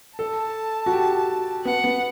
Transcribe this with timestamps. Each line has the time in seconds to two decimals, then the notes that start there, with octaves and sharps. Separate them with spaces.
0.19 A4 A5
0.86 F#4
0.92 G4
1.65 B3 F#5
1.84 B3